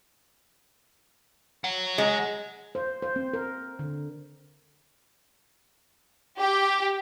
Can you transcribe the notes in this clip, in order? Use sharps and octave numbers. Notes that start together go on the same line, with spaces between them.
C#5 F#5
G#3
C5
C5
C4
A#4
D3
G4